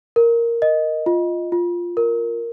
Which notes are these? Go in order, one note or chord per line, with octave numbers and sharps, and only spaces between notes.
A#4
D#5
F4
F4
A#4